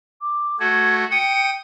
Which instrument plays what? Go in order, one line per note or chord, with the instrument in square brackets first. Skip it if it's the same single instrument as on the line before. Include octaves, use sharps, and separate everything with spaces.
[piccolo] D6
[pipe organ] A3 F#4 [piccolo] G#6
[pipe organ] G5 D#6 [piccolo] C#7